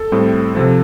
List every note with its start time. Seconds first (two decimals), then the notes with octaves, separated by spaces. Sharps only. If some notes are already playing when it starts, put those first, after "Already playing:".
Already playing: A4
0.12 A2 G3 C4
0.54 C3 F3 C4 A4